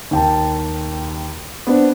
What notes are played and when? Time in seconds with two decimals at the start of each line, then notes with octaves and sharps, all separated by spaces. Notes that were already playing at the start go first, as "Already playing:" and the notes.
0.11 D#2 G5 A5
1.67 B3 C4 D4 C5